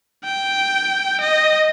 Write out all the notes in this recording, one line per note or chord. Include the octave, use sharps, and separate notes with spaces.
G5
D#5